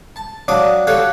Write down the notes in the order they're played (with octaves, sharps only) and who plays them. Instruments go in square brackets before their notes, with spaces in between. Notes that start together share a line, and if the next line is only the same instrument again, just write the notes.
[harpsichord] A5
F#3 D4 D5 F5 A5 D#6
F#4 G4 A4 C#5 F5 F#5